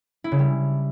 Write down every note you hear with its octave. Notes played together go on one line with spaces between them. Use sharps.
E4
C#3
G3